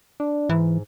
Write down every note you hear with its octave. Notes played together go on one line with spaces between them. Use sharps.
D4
G#2 E3